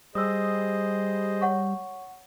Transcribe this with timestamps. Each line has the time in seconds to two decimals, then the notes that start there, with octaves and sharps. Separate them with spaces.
0.15 G3 G#4 C5 D#5 D#6 E6
1.41 C#5 F#5 C#6